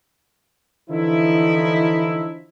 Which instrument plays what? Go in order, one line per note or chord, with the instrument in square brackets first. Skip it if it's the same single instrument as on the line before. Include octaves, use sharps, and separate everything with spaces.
[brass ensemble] D3 E3 F3 D#4 E4